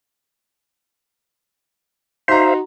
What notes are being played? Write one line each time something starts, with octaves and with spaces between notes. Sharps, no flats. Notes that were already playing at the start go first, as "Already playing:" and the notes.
D#4 F#4 C5 E5 F5 A#5 C6